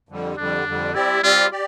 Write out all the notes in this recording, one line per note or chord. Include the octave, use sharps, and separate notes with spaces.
F2 D3 G3
F2 D3 G3 D4
F2 D3 G3
G3 C4 E4 G4 D5
G3 C4 F4 G4 D5
G4 D5